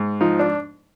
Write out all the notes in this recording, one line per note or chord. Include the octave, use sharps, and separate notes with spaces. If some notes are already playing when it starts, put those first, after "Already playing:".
Already playing: G#2
F3 D#4
D4